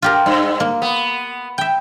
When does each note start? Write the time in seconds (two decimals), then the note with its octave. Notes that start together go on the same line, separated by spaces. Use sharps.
0.02 F4 G4 A#4
0.26 G2
0.60 A#3
0.82 B3
1.58 E5 G5